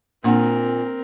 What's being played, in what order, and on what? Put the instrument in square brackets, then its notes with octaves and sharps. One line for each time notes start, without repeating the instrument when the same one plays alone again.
[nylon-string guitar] A#2 [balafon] A#3 D4 F#5 [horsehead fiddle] C4 A#4